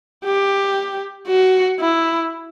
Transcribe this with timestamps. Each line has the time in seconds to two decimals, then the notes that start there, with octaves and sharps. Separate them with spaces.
0.25 G4
1.28 F#4
1.80 E4